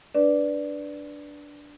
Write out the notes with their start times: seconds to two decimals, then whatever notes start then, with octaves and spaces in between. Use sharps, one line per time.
0.15 D4 B4 D5